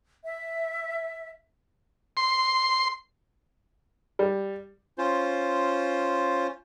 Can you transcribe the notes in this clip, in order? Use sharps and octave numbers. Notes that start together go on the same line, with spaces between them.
E5
C6
G3
C#4 F4 C5